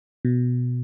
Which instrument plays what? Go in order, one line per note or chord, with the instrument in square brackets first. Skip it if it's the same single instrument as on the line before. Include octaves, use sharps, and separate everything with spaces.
[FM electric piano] B2